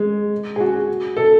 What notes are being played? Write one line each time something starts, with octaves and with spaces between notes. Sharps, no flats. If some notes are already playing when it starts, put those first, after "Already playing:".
Already playing: G#3
G#4
F#4
A4